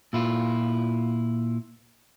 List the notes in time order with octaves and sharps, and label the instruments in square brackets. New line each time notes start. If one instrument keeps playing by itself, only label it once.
[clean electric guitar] A#2 E4 F4